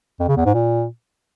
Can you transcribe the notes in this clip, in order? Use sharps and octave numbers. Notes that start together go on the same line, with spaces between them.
F2
C#3
E2
G#2
A#2